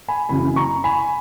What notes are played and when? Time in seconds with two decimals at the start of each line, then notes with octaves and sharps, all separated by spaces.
0.08 G#5 B5
0.29 F#1 F#2 C#3 E3 G#5 B5
0.56 A#5 C#6
0.84 G#5 B5